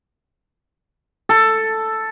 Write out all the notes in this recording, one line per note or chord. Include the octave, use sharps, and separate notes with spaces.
A4